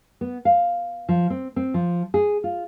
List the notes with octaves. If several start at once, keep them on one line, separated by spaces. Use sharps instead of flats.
B3
F5
F3
C4
C4
F3
G#4
F4